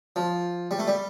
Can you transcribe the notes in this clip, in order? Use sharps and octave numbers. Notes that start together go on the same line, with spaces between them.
F3
G3
A3
G3